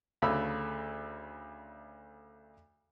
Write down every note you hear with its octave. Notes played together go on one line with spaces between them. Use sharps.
D2 C#3 A3 B5 E6